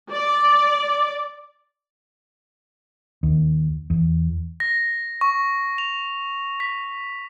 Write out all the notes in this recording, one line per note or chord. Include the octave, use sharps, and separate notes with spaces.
D5
D#2
E2
A#6
C#6
F7
B6